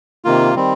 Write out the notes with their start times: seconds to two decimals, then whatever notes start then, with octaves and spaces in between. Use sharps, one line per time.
0.25 C3 D#3 A#3 F4
0.55 D#3 G3 C4